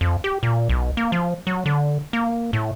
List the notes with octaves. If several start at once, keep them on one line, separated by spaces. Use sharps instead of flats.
F2
G4
A#2
B1
A#3
F3
F#3
D3
A#3
A2